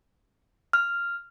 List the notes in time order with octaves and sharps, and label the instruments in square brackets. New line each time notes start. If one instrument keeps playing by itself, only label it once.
[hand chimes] F6